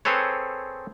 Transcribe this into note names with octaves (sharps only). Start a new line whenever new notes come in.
C4 G#4 A4 B4 C#5